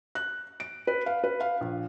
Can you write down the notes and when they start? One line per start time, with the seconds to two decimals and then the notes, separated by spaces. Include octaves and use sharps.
0.15 F#6
0.60 D7
0.87 B4
1.06 F5
1.24 B4
1.41 F5
1.61 A#1